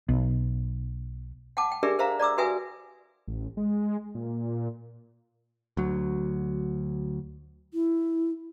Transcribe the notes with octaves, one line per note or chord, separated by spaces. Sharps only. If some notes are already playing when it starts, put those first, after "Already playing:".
B1
F#5 G5 A5 D6
G5
D4 G4 G#4 A#4 D5 E5
A#4 C5 E5 F5 A#5
D5 A#5 D6 E6
F#4 B4 E5 G5 G#5 D#6
A1
G#3
A#2
D2 F#3
E4